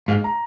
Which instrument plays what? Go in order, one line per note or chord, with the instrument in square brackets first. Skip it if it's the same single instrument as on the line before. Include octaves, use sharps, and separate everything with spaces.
[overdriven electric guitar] G#2 [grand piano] F5
[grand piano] A#5